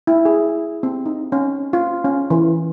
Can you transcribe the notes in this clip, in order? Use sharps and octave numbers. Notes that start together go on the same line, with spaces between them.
E4
G#4
C4
D#4
C#4
F4
C#4
E3